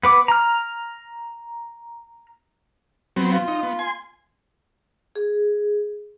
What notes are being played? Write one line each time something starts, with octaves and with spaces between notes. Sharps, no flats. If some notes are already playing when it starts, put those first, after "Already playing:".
B3 B4 D6
A#5 F6
F#3 B3 C4
F4
D#4
B3
G#5 C6
G#4